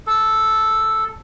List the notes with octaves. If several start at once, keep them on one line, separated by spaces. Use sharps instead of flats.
A4